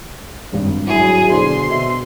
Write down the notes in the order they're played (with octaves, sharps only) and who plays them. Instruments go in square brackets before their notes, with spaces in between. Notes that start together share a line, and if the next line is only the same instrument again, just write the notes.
[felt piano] G#1 G2
[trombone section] F#3 E4 [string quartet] G#4
[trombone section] B2 D3 [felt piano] G#4 C5 D5 [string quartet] C6
[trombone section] B2 [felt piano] D#5 E5